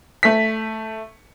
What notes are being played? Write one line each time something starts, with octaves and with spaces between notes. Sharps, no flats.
A3 B6